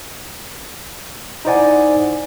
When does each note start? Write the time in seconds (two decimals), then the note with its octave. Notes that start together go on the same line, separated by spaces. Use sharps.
1.45 D#4 E4 C5 D5 F#5 G#5